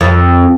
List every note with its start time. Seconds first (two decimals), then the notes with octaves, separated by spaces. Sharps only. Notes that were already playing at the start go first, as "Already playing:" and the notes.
0.01 F2